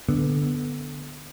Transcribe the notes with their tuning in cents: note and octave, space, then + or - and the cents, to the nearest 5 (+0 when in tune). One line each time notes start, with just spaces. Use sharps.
D3 +0 B3 +0